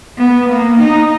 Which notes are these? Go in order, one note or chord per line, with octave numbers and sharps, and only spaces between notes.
B3
A#3
D#4